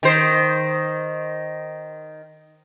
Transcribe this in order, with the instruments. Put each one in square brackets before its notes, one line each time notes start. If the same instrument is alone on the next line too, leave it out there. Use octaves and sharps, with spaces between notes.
[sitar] D#3 C5